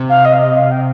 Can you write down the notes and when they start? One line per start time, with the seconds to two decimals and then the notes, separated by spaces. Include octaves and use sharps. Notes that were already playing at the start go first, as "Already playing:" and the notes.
Already playing: C3
0.09 F5
0.25 D#5
0.33 F5
0.40 D#5
0.56 F5
0.71 G5